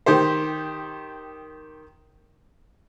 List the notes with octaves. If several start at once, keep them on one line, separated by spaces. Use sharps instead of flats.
D#3 G4 C5